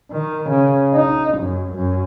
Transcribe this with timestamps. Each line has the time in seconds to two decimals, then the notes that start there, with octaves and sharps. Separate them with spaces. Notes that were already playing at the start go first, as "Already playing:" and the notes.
0.12 D#3
0.50 C#3
0.94 D#4
1.38 F#2
1.75 F#2